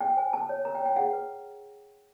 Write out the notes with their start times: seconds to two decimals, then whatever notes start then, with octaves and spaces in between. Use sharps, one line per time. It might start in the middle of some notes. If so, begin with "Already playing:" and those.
0.01 A4 G5
0.17 C5 G#5
0.33 A4 A5
0.49 C#5
0.65 A#4 A#5
0.75 G5
0.80 C#5
0.85 G5
0.96 G#4 F#5
1.13 B4